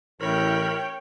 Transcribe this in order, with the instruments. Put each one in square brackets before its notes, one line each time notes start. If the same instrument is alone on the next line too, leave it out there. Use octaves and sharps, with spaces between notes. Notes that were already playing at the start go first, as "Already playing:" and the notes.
[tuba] A1 [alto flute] E4 [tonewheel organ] A#4 B5 [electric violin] C#5 G5